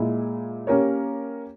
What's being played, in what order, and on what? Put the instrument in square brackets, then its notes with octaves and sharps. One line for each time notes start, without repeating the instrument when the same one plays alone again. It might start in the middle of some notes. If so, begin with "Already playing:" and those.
Already playing: [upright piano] A#2 G#3 E4
A#3 C#4 G4 A#4 C#5